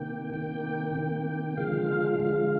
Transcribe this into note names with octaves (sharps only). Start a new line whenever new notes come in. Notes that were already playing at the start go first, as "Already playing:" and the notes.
Already playing: C3 D#3 A#3 G5
C3 D#3 A#3 G5
C3 D#3 A#3
D3 F3 G#3 F5
D3 F3 G#3